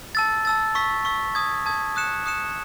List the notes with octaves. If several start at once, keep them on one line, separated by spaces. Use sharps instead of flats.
A5 E6 A6
A5 E6 A6
C#6 E6 B6
C#6 E6 B6
A5 D#6 G#6
A5 D#6 G#6
D#6 F#6 C#7 E7
D#6 F#6 C#7 E7